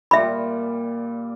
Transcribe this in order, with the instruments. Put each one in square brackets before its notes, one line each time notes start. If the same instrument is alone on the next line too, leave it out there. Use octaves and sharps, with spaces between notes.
[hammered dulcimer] A#2 G3 [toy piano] E5 B5